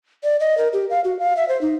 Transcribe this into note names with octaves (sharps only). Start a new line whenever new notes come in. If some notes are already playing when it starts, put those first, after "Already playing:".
D5
D#5
A#4
G4
F5
F#4
F5
E5
C5
D#4